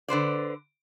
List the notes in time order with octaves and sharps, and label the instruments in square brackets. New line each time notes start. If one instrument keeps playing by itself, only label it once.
[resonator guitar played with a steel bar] D3 B4 C5 D5